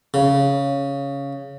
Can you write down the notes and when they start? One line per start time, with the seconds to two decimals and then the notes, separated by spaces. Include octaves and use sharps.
0.14 C#3